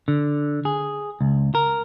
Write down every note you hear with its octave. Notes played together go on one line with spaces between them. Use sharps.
D3
G#4
C#2
A#4